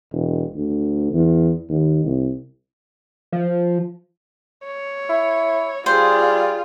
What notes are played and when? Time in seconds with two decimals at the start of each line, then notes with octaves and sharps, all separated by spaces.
0.12 E1
0.55 D2
1.13 E2
1.69 D#2
2.05 C2
3.33 F3
4.64 C#5
5.09 E4
5.86 G3 F4 G#4 C5 D5